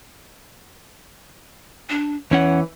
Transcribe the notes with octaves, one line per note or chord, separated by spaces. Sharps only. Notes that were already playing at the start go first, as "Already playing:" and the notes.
D4
E2 E3 C#4 C#5 F#5